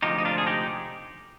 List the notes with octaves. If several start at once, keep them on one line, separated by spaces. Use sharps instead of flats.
D2 C3 F3 G#3 D#4 G4
D#4
D4 F4
G#4
D#4 G4